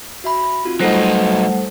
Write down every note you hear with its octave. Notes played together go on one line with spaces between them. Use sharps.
F#4 E5 B5
C4 D#4 F4 F#4
F#3 G3 A3 D#4 A4 A#4 C5 F#5